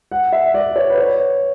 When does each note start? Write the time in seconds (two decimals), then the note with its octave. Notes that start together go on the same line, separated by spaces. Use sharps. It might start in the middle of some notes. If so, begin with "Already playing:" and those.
0.12 F#5
0.32 E5
0.54 D5
0.76 C#5
0.90 B4
0.98 C#5